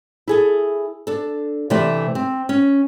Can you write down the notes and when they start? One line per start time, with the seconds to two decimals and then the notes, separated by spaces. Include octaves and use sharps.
0.27 E4 G#4 A4
1.07 D4 A4
1.70 C3 E3 A3 D5 A5
2.15 C4
2.49 C#4